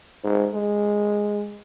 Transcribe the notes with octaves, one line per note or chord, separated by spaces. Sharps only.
G#2
G#3